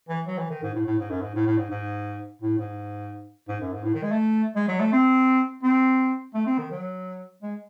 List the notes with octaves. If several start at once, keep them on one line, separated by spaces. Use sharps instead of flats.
E3
F#3
E3
D#3
G#2
A2
A2
G#2
F#2
G#2
A2
A2
G#2
G#2
A2
G#2
G#2
F#2
G#2
A2
D#3
G#3
A3
G#3
F#3
A3
C4
C4
A3
C4
D#3
F#3
G#3